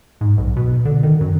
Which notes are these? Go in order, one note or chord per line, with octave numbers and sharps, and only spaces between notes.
G#2
B1
B2
D3
D#3
F#2